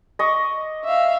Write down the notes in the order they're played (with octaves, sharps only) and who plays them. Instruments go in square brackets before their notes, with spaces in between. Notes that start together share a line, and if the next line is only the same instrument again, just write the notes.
[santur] D#5 C#6 D6
[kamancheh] E5 F5